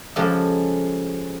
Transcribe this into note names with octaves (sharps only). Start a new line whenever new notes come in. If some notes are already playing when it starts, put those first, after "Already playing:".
C#3 F3 G#3 F#4 G4 A4